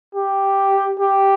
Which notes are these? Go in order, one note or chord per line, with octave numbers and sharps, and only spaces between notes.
G4
G4